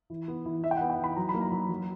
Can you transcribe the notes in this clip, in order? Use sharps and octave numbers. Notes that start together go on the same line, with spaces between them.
E3
B3
E3
E3 E5
G5
F#5
B3
G5
E3 B5
F#3 A#5
B5
A#3
A#5
F#3
F#3